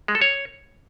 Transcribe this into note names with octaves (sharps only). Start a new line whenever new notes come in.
G#3
A4
C#5